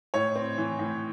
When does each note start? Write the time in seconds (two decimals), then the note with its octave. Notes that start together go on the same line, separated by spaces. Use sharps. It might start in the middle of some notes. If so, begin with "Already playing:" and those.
0.14 A2 C#5
0.36 C4
0.58 E3
0.79 A2